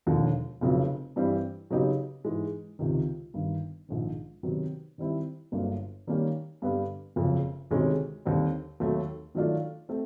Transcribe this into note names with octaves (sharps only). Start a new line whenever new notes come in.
E1 D#2 D3 F3
F1 F2 C#3 F#3
G2 E3 G3 C4
C#3 F#3 B3 D#4 G4
G#2 E3 G#3
C#2 C3 D#3
G1 G2 D#3
A#1 G#2 D#3
C3 D#3 F#3 B3 D#4
D#3 G3 C4 E4
G1 G2 D3 F#3 A#3
D#3 G3 A#3 C#4
G2 D3 G3 B3
F#1 F2 C#3
D2 C3 D#3 G#3 C#4
D#2 D3 G3 C4
D#2 D#3 F#3 A3
D#3 F#3 A3 D4 F4
A3 C4